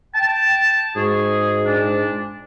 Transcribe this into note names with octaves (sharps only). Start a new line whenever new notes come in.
G5 A5
G#2 F#4 G#4
A#2 D4